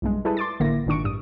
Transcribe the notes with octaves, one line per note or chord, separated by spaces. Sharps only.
B1 G2 G#3
G3 E4 G#4 A4 B4
C6 D6 A6
A1 D3 A#3 E4 A#6
G#1 A#2 D#3 D4 C#6 D7
A1 G2 D#6